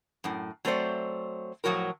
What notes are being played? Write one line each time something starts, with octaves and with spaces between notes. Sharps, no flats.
F#2 A2
F#3 A3 C4 C5 D5
A2 F3 F#3 F#4 A#4